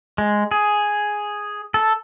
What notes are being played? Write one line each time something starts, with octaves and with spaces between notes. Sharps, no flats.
G#3
G#4
A4